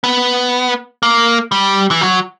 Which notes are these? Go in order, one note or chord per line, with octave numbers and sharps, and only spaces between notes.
B3
A#3
G3
E3
F#3